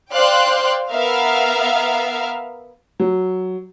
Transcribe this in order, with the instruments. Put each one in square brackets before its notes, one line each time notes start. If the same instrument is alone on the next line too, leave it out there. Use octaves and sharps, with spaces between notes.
[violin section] C5 D5 F5 G5 C6 F#6
B3 A#4 E5 F5 F6
[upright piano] F#3